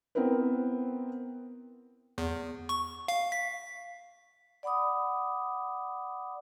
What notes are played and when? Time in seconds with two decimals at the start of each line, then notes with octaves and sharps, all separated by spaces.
0.15 B3 C4 E4 A#4 B4
2.18 E2
2.69 C#6
3.08 F5
3.32 B6
4.63 D5 F#5 B5 D6 D#6